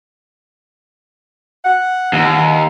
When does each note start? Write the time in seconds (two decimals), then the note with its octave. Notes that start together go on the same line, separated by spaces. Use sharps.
1.64 F#5
2.13 D#2